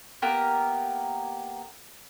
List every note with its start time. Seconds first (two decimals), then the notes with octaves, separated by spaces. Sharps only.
0.22 A#3 B3 G4 A#4